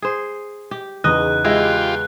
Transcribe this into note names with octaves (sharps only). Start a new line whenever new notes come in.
G#4 C5
G4
E2 C#3 D#4 D#5 F#6
G#3 E4 F4 G4